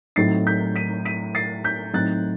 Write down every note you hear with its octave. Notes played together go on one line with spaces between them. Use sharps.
A2 F#3 C4 D#4 A6 C7
G6 B6
B6 D#7
B6 D#7
A6 C7
G6 B6
A2 F#3 C4 D#4 F#6 A6